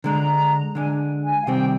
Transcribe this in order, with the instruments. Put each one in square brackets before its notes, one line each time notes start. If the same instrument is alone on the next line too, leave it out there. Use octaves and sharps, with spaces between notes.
[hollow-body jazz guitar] D3 G#3 D4 [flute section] A#5
[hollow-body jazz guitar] D3 G#3 D4 [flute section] G#5
[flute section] G#5
F5
[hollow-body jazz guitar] C3 D#3 G3 C4 [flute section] G5